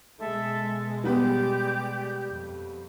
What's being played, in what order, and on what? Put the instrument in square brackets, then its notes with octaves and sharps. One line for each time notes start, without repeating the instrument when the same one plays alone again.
[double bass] B2 G#3 [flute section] A4 E5
[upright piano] G3 B3 B4 [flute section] G4 D5 G6
[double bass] F2